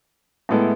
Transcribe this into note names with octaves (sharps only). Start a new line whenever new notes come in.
A2 G#3 B3 E4 A4